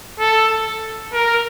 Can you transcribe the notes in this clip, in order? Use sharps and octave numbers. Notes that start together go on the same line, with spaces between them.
A4
A#4